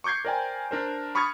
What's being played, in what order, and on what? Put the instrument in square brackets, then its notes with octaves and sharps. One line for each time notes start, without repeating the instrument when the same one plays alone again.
[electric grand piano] C#6 D6 G6 G#6 C7
A#4 C5 D5 G5 G#5
D4 A#4 C5
B5 C#6 D#6 F6 G#6 A6